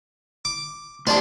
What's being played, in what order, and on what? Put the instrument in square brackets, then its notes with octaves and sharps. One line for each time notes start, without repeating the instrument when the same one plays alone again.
[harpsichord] D6
[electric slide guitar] A2 D5 A5 [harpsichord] G4 C5